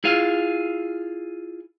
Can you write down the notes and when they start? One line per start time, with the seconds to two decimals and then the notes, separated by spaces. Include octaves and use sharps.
0.04 E4 F4 G#4 F5